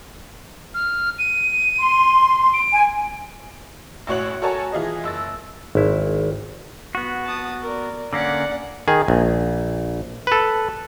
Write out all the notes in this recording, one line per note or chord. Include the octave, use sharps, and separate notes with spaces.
F6
D#7
C6
D7
G#5
A1 A2 F#4 C#5 F#6 F#7
F#4 A4 A#4 C#5 G#5 A5
E3 F4 G#4 D#5
F#1 E6 A6
G#1 E4
B3 F#4
A5 D#6
A#4 D5
D3 A#3 C#4 D5 F#5
D#3 G#4
A#1
A4 B4